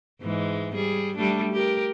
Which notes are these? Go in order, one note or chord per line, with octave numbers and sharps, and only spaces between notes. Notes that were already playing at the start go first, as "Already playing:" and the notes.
G#2 E3 G#3
G3 G#4
G3 A3 D4
G4 A#4